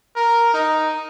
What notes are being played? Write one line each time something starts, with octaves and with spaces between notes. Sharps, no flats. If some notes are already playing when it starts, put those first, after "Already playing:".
A#4
D#4